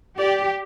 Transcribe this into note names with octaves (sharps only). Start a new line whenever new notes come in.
G4 D5